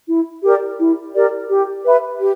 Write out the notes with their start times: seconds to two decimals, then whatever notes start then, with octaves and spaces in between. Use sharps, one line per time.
0.08 E4
0.43 G4 A#4 D5
0.79 E4
1.14 G4 A#4 D5
1.50 G4
1.84 B4 E5 B5
2.20 G4